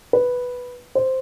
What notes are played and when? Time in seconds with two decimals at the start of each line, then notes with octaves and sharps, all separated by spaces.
0.13 B4
0.95 C5